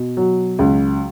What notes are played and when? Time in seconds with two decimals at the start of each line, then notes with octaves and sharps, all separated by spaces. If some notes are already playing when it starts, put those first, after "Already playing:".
Already playing: B2
0.17 F#3
0.59 C#2